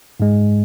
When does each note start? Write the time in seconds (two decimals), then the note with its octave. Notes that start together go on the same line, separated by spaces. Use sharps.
0.20 G#2 G#3